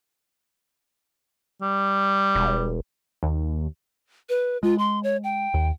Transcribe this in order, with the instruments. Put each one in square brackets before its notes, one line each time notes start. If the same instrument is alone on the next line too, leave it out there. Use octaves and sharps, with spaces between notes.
[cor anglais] G3
[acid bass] E1
[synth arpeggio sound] D#2
[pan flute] B4
[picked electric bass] G#3 [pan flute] F4
[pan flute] C6
C#5
G5
[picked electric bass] D#2